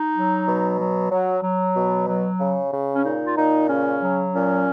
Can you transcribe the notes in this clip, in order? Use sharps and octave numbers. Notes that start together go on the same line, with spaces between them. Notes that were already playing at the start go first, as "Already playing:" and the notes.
Already playing: D#4
F#3
B2
F#3
F#3
F#3
B2
F#3
C#3
C#3
C#4
A#2 D#4
F4
A#2 D#4
C#3 C#4
F#3
A#2 C#4